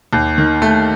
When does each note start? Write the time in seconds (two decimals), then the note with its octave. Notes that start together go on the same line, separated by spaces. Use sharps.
0.13 D#2
0.38 D#3
0.62 A3